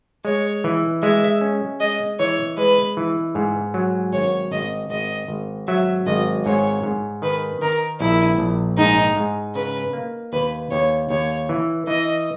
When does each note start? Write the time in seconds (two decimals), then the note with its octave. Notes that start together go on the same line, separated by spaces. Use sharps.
0.25 G#3 C#5
0.64 E3
1.03 G#3 E5
1.41 C#4
1.80 G#3 D#5
2.19 E3 C#5
2.57 G#3 B4
2.97 E3
3.35 G#2
3.74 F#3
4.13 G#1 C#5
4.52 G#1 D#5
4.90 G#1 D#5
5.28 G#1
5.67 F#3 E5
6.06 G#1 D#5
6.45 G#2 C#5
6.83 G#2
7.22 D#3 B4
7.62 D#3 A#4
8.00 A#1 E4
8.38 A#1
8.78 G#2 D#4
9.17 G#2
9.55 C#3 B4
9.93 A#3
10.33 D#2 B4
10.71 D#2 C#5
11.10 D#2 C#5
11.49 E3
11.87 E3 D#5